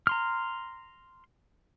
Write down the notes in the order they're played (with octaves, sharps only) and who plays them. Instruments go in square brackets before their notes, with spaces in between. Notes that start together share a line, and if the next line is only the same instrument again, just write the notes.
[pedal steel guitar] A#5 C6 F6